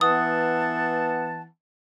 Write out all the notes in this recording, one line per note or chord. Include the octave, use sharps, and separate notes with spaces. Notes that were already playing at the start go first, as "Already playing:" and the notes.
E3 B3 F#5 A5 D#6